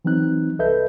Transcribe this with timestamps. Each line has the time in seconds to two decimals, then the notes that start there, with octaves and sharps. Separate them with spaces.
0.05 E3 F#3 C4 D#4 F#6
0.59 C2 A4 B4 D#5 E5 G6